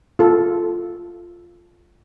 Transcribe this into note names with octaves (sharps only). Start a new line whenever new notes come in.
F4 A4